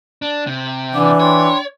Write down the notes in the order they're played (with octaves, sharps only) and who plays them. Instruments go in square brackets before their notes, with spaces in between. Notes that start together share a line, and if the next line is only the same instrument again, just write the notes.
[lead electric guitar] D4
C3
[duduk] E3 [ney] D4 [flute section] D5 F#5 D6
[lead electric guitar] C#5 [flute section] G5 B5 C6